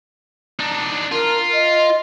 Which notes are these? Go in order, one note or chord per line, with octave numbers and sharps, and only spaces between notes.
D4 D#4
F4 A#4
D#5